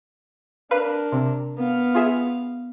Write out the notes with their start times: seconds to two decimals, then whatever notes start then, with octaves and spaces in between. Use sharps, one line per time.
0.71 D4 A#4 B4 F5
1.12 C3
1.57 B3 F5
1.95 F4 G#4 E5